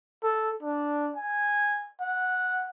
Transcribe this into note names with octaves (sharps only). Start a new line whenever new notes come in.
A4
D4
G#5
F#5